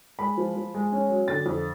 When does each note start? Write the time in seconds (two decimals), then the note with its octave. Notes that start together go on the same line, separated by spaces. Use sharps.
0.19 G#3 B5
0.37 F3
0.56 F3
0.74 G#3
0.92 C#4
1.10 F#3
1.28 D3 A6
1.46 F2